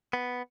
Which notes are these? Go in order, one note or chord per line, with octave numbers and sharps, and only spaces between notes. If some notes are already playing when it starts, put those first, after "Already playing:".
B3